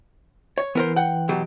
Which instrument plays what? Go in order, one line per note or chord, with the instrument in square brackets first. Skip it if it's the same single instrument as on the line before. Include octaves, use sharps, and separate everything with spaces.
[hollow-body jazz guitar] C#5
[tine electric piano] E3 [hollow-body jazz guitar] B3 A#4 C5
[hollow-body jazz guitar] F#5 G5
B2 F#3 G4